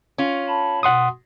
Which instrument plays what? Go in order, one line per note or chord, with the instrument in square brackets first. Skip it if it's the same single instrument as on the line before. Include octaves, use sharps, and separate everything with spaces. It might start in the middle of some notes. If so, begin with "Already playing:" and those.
[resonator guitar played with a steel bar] C#4 F4
[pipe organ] A5 B5
[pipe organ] B2 [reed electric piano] F#5 C6 D#6